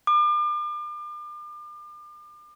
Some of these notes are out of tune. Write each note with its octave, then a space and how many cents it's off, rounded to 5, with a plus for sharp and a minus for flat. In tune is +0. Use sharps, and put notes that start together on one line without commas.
D6 +40